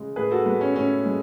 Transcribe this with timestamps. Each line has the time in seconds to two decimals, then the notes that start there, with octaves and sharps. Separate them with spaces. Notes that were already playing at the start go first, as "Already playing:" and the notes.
Already playing: C#3 G#3
0.16 A2 G#4 B4
0.31 F#4 A4
0.46 G#3 B3
0.61 C#4
0.76 A2 C#4
1.06 G#3